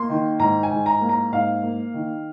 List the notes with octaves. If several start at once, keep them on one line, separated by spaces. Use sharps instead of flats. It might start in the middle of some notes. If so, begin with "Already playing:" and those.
Already playing: A#3 C6
D#3
G#2 A#5
G#5
G#2
A#5
A#3
A#5
G#2 F5
A#3
D#3